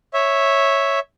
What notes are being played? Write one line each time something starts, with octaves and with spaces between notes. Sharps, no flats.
C#5 E5